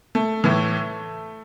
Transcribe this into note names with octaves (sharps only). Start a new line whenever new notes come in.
A3
A2 E3